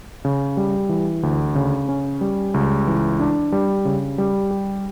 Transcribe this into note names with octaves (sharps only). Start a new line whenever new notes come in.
C#3
G3
E3
D2
C#3
C#4
G3
C#2
E3
D4
G3
C#3
G3
G4